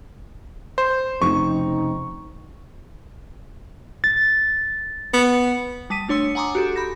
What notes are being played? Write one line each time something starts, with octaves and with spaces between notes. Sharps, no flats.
C5
F1 C#3 C4 D#4 C#6
A6
B3
G3 A5 D#6 B6 D#7
A3 D4 C#5 C6 E6 C#7
F#5 G#5 A#5 C6 D6 D#6
F#4 G4 A4
B5 G6 A#6